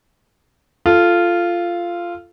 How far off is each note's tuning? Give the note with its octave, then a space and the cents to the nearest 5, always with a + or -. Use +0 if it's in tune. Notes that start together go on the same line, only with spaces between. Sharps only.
F4 -10 A4 +0